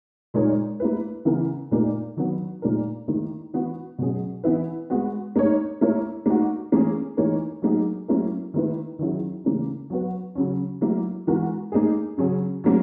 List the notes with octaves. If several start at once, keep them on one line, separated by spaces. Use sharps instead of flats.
A#2 G#3 D#4 A#4 C#5
A#3 E4 B4
C#3 E3 B3 E4 A#4
A#2 A#3 D#4 A#4
D#3 F#3 B3
A#2 A#3 D#4 A#4
D#3 A#3 E4
E3 B3 F#4
B2 F#3 C#4 G#4
E3 B3 E4 B4
G#3 B3 F#4
A#3 D#4 A#4 C#5
A#3 E4 A#4 C#5
A#3 D#4 F#4
E3 A#3 C#4 G#4
E3 A#3 D#4 A#4 C#5
F#3 A#3 D#4 G#4
F#3 A#3 C#4 E4 A#4
D#3 A#3 E4 B4
D#3 F#3 C#4 E4 G#4
C#3 E3 A#3 C#4
F#3 B3 F#4 B4
C#3 F#3 C#4
F#3 A#3 E4
E3 G#3 B3 F#4 A#4
A#3 D#4 G#4
C#3 F#3 C#4 G#4
F#3 A#3 C#4